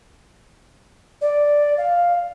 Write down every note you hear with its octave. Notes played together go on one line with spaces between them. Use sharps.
D5
F5